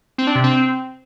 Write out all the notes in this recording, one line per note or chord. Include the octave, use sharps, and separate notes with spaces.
C4
D4
C3
C4